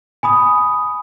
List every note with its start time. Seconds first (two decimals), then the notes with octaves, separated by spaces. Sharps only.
0.23 G#5 B5 D#6